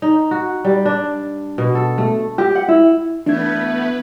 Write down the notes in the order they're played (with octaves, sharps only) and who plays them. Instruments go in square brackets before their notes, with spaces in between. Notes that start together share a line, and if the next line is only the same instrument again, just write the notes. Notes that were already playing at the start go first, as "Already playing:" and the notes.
[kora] D#4
F#4
G3
D4
B2
A4
A3
[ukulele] G4
F#5
E4
[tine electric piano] E3 G#6 [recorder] A3 [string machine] B3 B4 [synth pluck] D4